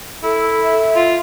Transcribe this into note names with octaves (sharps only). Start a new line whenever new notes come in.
E4 A4
E5
F4